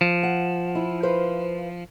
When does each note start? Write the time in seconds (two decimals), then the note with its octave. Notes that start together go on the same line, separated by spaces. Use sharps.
0.01 F3
0.23 F#5
0.75 E4
1.03 B4 C5 F5